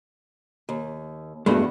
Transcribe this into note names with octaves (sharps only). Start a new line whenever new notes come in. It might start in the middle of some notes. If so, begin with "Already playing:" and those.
D#2
E2 G2 G#3 A3 F#4